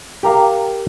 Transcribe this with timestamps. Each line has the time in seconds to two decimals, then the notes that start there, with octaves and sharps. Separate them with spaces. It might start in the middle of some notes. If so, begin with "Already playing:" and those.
0.23 G4 A#4 F5